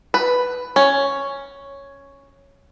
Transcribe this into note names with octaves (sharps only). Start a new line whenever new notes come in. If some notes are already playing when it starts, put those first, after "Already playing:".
B4
C#4